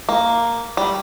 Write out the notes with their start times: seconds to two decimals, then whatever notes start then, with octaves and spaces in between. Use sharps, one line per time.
0.09 A#3
0.77 G3